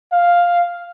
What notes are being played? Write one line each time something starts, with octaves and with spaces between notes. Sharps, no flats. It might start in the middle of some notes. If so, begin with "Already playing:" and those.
F5